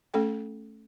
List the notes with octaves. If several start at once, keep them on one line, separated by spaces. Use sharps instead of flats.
A3 C#4 A4 G5